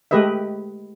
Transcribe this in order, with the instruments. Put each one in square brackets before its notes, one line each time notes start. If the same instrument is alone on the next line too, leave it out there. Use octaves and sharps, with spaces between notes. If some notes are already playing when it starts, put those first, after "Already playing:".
[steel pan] G#3 A3 G4 B4 D#5 E5